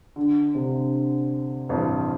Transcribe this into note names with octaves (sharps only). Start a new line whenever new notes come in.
D3
C3
A1 G2 F3 C4 F4